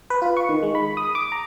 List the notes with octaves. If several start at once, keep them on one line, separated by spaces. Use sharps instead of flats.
B4
F4
C#6
D#3
G#3
B5
D#6
D6
A#5